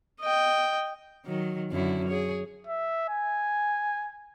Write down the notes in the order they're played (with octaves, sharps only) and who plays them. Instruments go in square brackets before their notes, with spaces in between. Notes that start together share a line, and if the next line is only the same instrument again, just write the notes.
[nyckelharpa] D#5 G5
[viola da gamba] D#3 F#3
F#2 D3 E4
G#4 C#5
[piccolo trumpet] E5
G#5